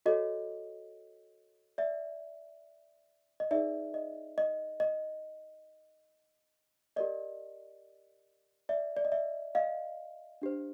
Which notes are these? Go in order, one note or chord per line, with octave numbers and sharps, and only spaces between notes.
F#4 A4 C#5 D#5
D5 E5
D#5
D#4 G#4 B4 D5 E5
D#5
D#5
D#5
G4 A#4 D5 D#5
D5 E5
D5
D#5
D5 E5
D#5 F5
D4 G4 C5